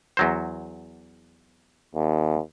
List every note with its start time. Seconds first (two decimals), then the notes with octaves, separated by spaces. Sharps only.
0.17 E2 F#3 C5
1.95 D#2